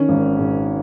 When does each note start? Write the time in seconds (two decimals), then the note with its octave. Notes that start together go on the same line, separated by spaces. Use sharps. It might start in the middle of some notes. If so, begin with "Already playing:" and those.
Already playing: D#3 C#4
0.09 G#1
0.39 G#2